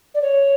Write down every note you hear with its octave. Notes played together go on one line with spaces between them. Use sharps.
D5
C#5